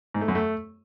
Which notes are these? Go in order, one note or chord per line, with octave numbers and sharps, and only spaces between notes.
G#2
A3
F#2
A3